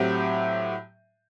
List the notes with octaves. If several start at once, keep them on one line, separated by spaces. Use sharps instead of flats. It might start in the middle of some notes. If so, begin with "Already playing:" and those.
Already playing: A2 F#3 C4 G4